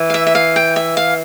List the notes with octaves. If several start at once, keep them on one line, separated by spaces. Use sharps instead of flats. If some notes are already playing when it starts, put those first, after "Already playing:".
Already playing: E3
F5
E5
E5
F5
G5
E5
F5